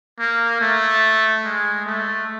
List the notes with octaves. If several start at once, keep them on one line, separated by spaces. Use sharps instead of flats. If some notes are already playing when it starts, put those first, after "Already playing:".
A#3
A3
G#3
A3